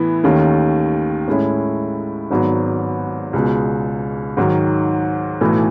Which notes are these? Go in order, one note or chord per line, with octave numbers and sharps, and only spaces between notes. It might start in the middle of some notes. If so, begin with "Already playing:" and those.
Already playing: A2 E3 B3 E4
D#2 D#3 A3 C#4
A2 G#3 C#4 E4
G#1 G#2 F#3 B3
C#2 B2 G#3
G#2 D#3 F#3
B1 A2 E3 A3